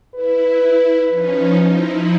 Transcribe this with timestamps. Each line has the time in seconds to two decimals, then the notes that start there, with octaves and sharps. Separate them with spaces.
0.14 E4 B4
1.08 F3 C#4 D#4
1.59 F3 D#4 E4